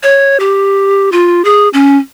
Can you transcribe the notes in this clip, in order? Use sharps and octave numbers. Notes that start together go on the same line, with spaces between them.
C#5
G4
F4
G#4
C#4